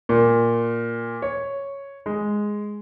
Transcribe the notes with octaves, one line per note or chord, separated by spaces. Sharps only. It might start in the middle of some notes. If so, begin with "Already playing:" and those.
A#2
C#5
G#3